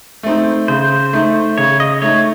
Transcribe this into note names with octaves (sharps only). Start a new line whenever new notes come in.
A3 C4 D#4
C#3 C5
A3 D#4
C#3 C#5
D#5
A3 D#4 C#5